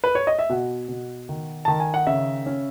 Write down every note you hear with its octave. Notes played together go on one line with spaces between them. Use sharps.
B4
C#5
D#5
E5
B2 F#5
B2
D#3
D#3 A5
G#5
F#5
C#3 E5
C#4